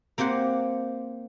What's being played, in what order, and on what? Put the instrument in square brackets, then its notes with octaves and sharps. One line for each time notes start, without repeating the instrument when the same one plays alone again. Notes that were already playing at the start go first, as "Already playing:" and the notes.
[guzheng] A#3 C4 G4 C5 F#5